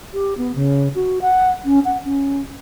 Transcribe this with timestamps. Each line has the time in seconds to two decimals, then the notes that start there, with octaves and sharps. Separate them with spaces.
0.14 G4
0.37 B3
0.56 C#3
0.95 F#4
1.22 F#5
1.65 C#4
1.85 F#5
2.05 C#4